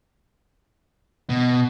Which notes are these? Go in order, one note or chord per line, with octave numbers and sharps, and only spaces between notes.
B2